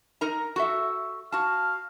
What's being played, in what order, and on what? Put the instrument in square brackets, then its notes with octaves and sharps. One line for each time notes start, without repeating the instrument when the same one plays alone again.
[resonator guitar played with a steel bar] D#4 A#4 A#5
F#4 A4 E5
[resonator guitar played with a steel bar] F#4 A5 [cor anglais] F5